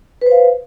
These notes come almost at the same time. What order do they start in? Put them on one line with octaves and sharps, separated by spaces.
B4 C5 F5